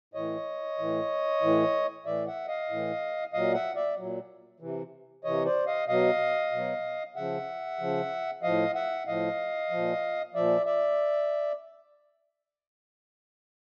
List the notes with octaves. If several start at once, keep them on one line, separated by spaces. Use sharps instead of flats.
A2 E3 C#5 D#5
A2 E3
A2 E3
A2 E3 D5 E5
E5 F#5
D#5 F5
A2 E3
A#2 F#3 D#5 F5
E5 F#5
D5 E5
A#2 F#3
C3 E3
C3 E3 C#5 D#5
C5 D5
D#5 F5
B2 F#3 D#5 F5
B2 F#3
C#3 F3 E5 F#5
C#3 F3
A2 F3 D#5 F5
E5 F#5
A2 F3 D#5 F5
A#2 F3
A#2 F3 D5 E5
D5 E5